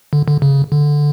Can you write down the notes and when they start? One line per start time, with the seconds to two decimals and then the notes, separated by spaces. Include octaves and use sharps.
0.13 D3
0.28 D3
0.42 C#3
0.72 D3